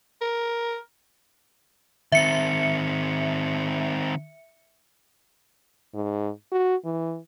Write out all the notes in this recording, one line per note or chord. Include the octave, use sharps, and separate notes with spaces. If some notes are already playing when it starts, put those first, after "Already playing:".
A#4
D#3 C4 E5 C#7
G#2
F#4
E3